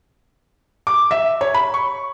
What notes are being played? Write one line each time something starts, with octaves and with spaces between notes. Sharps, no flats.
D6
E5
C#5
B5
C#6